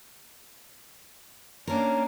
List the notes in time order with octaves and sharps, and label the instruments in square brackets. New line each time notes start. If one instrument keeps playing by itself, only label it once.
[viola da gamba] A#3 D4 [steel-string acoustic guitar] C#4 A#4